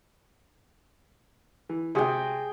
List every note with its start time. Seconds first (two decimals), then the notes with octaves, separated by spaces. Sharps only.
1.69 E3
1.95 C3 F#4 G#4 G5